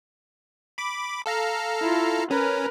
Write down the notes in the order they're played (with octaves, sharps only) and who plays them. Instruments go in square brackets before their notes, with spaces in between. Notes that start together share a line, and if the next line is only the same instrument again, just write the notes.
[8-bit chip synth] B5 D6
A4 F5 A#5
[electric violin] E4 F4
[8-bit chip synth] C#4 [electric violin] A#4 B4